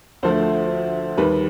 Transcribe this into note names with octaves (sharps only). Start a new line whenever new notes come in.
D2 D3 F3 A3 C5
D#2 D#3 G3 B4